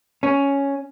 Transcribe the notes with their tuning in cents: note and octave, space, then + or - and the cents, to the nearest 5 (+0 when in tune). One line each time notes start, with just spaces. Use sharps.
C#4 +5